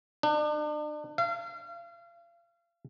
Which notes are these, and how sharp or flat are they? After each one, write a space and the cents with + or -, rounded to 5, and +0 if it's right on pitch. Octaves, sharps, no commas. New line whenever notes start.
D4 +40
F5 -35